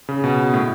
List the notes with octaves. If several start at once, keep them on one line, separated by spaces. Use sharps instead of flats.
C#3
B2
A2